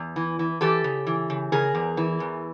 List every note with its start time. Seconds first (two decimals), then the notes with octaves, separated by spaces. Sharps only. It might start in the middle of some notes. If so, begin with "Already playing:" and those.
Already playing: E2
0.16 E3
0.39 E3
0.61 E3 G4 A4
0.84 C#3
1.07 E3
1.30 C#3
1.52 C#3 G#4 A#4
1.75 E2
1.97 E3
2.20 E2